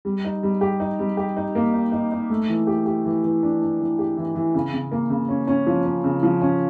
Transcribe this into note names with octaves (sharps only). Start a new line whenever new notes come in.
G3
D#4
G3
G4
D#4
G3
G4
D#4
A#3
D#4
D#4
D#4
A3
E3
G4
G4
E3
E3
D4
D4
E3
G4
E3
E3
C#3
C#3
A#3
C#3
C#4
C#4
F3
C#4
C#3
F3
C#4